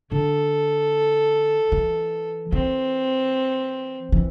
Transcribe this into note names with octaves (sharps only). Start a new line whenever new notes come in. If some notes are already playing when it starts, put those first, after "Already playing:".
D3 A4
E3
E3 C4
E3